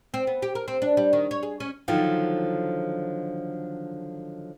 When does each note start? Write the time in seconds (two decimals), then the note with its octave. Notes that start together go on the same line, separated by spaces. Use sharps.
0.14 C4
0.27 B3
0.42 G4
0.55 A#4
0.68 C4
0.82 D4
0.97 G3
1.13 D#3
1.31 C#5
1.43 G#4
1.60 C#4
1.88 D3 D#3 F3 F#3 F4